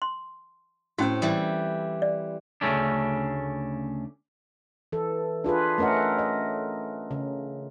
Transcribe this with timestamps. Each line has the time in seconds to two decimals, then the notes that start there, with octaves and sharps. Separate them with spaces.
0.02 C6
0.98 A2 C4 C#4 F#4
1.22 E3 G3
2.02 D5
2.61 D2 A2 C#3 A3 C#4 D4
4.92 E3 A4
5.44 D4 F4 G#4 B4
5.78 A3 C#4 A#4 D#5 F#5
6.19 D#5
7.11 C#3